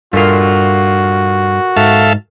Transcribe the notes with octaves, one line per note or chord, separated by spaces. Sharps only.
G2 A#2 A3 F4 F#4
G#2 A4 E5 F5